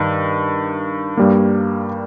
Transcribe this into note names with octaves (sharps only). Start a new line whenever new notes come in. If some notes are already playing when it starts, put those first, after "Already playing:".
Already playing: G2 D#3
G2 G3 A#3